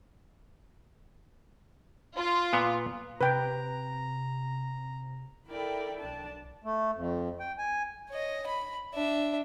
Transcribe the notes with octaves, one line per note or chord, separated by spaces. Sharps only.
F4
A#2 B3
C3 B4 G5 A#5
E4 A4 A#4 D5 E5 G5 B5
B1 D4 A5
A3
F2
G5
G#5
C#5 D#5
B5
D4 E5